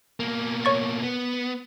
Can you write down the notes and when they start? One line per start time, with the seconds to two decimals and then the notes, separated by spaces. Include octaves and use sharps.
0.20 B2 A#3
0.65 C#5 C#6 A6
1.03 B3